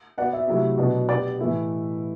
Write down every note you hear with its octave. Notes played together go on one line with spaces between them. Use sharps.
B3 F#4 B4 D5 F#5
E5
C3 F#3 A3 E4
B2 F#3 B3 D4
B3 D4 G4 D5
A2 E3 A3 E4 B4